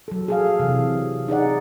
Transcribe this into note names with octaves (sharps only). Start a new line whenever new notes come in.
F#3 A4
G#4 A4 F5
C3 E3
D#4 G#4 D5 F#5